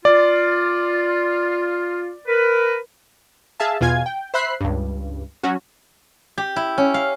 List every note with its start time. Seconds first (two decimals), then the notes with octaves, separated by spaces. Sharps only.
0.05 F4 D5
2.27 A#4 B4
3.60 G#4 E5 F5 A5
3.81 E2 B2 F4 G#5 G#6
4.06 G5
4.34 C5 E5 B5 F#6 C7
4.61 C#2 G2
5.43 F#3 C#4 F#4
6.38 G4
6.56 E4
6.78 C#4
6.94 F5